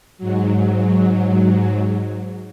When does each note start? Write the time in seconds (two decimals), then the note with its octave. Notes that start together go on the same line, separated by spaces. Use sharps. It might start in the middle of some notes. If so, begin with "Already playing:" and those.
0.18 G#2 F#3